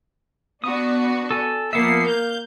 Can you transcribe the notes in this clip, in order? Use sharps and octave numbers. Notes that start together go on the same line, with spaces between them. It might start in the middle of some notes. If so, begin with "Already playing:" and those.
B3 D4 F#4 D#6
A4 G#5
F3 A#3 B3 E5 C7
F5 G6